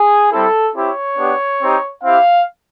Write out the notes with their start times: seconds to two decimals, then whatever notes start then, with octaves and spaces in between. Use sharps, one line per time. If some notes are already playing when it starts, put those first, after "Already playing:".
Already playing: G#4
0.32 G3 C4 E4 A4
0.75 C4 E4 G4 C#5
1.18 B3 D4 G4
1.61 C4 D#4 G4
2.03 C4 E4 G4 F5